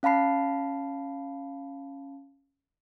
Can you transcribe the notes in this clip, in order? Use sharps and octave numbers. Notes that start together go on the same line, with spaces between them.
C#4 F5 A5 B5 C7